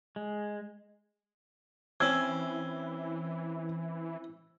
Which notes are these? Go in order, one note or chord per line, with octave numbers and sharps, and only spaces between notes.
G#3
E3 C4 C#4 E6 G#6